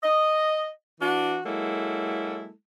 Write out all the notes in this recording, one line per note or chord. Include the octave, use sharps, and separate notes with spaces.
D#5
E3 D4 F#4
F#3 G#3 A#3 E4 A4